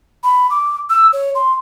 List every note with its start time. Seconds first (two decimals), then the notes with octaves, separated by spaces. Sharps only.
0.24 B5
0.50 D6
0.90 E6
1.13 C#5
1.35 C6